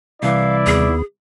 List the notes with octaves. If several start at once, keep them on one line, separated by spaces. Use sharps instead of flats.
C2 E3 E4 D5 F5
D#2 B3 G#4